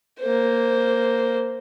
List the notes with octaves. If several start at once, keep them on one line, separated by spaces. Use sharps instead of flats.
A#3 C5